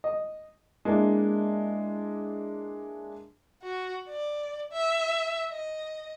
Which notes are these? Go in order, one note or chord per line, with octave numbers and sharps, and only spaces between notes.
D#5
G#3 A#3 D4 E4
F#4
D5
E5
D#5